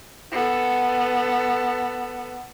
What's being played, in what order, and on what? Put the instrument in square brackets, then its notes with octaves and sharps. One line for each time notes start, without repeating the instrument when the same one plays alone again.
[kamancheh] B3 A4